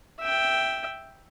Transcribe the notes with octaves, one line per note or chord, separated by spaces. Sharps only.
E5 G5